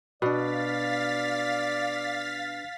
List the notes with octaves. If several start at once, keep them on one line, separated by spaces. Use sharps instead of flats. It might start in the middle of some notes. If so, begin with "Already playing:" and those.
B2 D4 B4 D5 F5 A6 B6